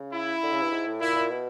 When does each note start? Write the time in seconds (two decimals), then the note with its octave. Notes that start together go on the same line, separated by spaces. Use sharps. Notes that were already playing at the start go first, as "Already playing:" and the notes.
Already playing: C#3
0.13 E4
0.43 D3
0.52 C#3
0.63 G2
0.71 G#2
0.87 A2
1.01 A#2 E4
1.15 A#2
1.30 B2